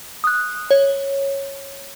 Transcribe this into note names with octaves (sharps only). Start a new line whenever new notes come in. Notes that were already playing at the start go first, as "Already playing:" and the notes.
D#6 F#6
C#5